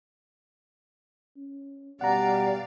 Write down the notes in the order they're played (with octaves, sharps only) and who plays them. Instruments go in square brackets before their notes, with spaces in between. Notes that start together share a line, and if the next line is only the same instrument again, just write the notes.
[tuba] C#4
[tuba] B2 [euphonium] G3 [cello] D5 F5 [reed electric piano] F#5 A#5